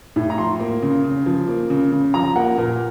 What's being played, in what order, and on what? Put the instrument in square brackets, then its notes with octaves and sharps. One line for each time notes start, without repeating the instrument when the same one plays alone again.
[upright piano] A2
A#5
F3 C6
A#3
C#3
C#3
F3
A#3
C#3
C#3
F3 A#5
A#3 F#5
A#2 A#4